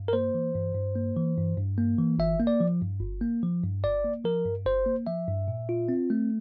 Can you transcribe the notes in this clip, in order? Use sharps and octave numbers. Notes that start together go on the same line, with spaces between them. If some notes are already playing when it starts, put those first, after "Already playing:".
Already playing: G2
A#4
A#3 C5
E3
G2
G2
A#3
E3
G2
G2
A#3
E3
G1 E5
A#3
D5
F3
G2
G1
A#3
F3
G2
G1 D5
A#3
F3 A#4
G2
G1 C5
A#3
F3 E5
G2
A#2
F4
C4
A3